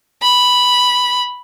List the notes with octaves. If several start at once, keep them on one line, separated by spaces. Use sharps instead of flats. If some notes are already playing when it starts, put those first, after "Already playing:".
B5